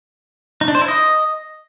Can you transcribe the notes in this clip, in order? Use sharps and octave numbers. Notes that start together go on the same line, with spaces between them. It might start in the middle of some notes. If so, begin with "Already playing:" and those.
D#4
D4
C5
E4
D#5